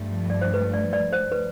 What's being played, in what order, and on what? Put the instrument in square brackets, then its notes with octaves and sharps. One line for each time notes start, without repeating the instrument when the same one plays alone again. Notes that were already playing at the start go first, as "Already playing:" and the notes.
Already playing: [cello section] G2 F3 A3
[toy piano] D5
C5
B4
D5
D5
C5
B4